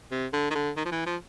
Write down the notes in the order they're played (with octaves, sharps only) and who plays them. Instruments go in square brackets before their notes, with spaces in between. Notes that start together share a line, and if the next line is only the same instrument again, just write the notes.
[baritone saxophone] C3
D3
D#3
D3
D#3
F3
E3
F3